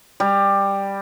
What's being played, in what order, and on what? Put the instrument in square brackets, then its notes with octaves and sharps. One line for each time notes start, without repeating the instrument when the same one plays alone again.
[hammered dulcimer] G3